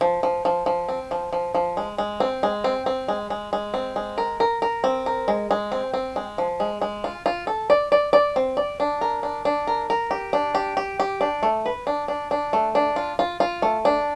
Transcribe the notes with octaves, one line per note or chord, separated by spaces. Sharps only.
F3
F3
F3
F3
C4
F3
F3
F3
G#3
G#3
C4
G#3
C4
C4
G#3
G#3
G#3
C4
G#3
A#4
A#4
A#4
C4
A#4
G#3
G#3
C4
C4
G#3
F3
G#3
G#3
F4
F4
A4
D5
D5
D5
C4
D5
D4
A#4
D4
D4
A#4
A#4
G4
D4
G4
G4
G4
D4
A3
B4
D4
D4
D4
A3
D4
F4
F4
F4
A3
D4